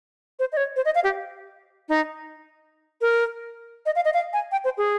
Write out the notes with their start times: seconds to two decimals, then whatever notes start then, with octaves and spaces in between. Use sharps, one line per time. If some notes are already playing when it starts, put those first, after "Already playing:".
0.39 C5
0.52 D#5
0.57 C#5
0.76 C5
0.85 D#5
0.95 F5
1.04 G4
1.89 D#4
3.01 A#4
3.86 D#5
3.96 F5
4.05 D#5
4.14 F5
4.33 G#5
4.52 G5
4.64 C5
4.77 G#4